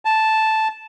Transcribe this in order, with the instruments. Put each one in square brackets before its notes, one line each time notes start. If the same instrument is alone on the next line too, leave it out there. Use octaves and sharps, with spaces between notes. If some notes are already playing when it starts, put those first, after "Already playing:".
[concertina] A5